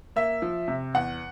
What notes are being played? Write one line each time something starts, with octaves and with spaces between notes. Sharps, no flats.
A#3 E5
F3
C3
E2 F#5